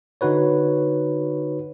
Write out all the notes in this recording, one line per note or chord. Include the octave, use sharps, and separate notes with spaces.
D3 D#4 F#4 B4 C#5